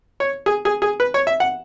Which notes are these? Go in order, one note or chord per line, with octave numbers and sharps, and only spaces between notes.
C#5
G#4
G#4
G#4
B4
C#5
E5
F#5